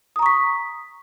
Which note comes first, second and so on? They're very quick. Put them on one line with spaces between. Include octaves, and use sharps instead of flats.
D#6 A#5 C#6 B6